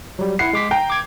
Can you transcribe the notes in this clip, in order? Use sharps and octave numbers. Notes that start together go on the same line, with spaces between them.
F#3 G3
E4 F#5 C7
G#3 D6 B6
G5 A#5
D6 G#6